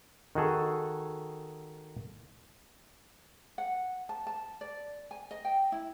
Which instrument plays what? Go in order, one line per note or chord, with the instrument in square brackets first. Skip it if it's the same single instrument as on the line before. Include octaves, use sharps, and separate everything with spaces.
[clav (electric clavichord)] D#3 F#4 G#4 A4
[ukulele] F#5
A5
A5
D5
G#5
D#5
G5
E4